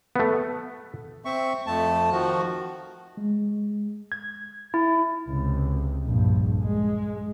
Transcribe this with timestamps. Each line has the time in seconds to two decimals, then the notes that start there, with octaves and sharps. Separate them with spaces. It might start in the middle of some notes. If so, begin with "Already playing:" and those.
0.16 A3 B3
1.25 C4 E5 C#6
1.67 F2 A3 A5
2.12 D#3 F3 F#4
3.17 G#3
4.12 G#6
4.74 E4
5.29 C#2 C3
6.05 A#1 G2
6.63 G#3